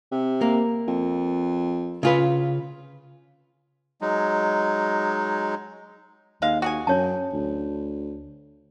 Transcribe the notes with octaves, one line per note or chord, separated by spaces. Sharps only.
C3
A#3
F2
C#3 F4 B4
F#3 G#3 D#4
D#2 G#3 F5
F#4 G#4 G#5
F#2 D4 C#5 A5
D2